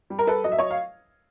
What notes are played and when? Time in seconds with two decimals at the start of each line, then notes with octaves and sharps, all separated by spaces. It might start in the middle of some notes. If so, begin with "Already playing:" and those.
0.10 G3
0.19 A#4
0.27 A4 B4
0.44 F#3 D#5
0.52 E5
0.58 C#5 D#5
0.70 F5